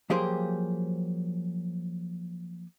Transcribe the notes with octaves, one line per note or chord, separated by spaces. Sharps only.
F3 F#3 A#3 G4 G#4 C5